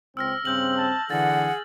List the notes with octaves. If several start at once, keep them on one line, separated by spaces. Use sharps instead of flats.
C#2 C4 E6 F6 A#6
G2 C#3 C4 E6 G6 F#7
A5
D3 E3 G#4 F#5 A6